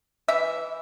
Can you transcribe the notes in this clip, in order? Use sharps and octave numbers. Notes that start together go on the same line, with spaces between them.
E3 E5